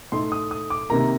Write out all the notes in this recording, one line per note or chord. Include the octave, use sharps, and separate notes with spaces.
A2 A3 D#4 C6
D#6
D#6
D6
C3 D#3 A#3 A#5